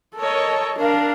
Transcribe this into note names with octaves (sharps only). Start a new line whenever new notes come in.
A4 A#4 C#5 D#5
D4 A#4 F5